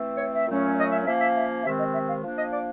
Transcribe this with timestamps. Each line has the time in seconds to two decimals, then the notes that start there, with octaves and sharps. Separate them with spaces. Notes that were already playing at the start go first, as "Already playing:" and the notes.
Already playing: E3 A3 C4
0.18 C#5
0.33 E5
0.48 A#2 F#3 A3 C#4
0.77 D#5
0.92 E5
1.06 F3 A#3 C#4 E5
1.20 E5
1.35 E5
1.64 C3 D#3 G#3 C4 E5
1.79 D#5
1.93 E5
2.08 F5
2.22 F3 A#3 D4
2.37 D#5
2.52 D5